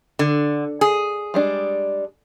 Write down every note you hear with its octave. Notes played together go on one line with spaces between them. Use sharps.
D3
G#4
G3 G#3 D4